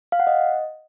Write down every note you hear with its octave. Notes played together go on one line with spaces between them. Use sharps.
F5
F#5
D#5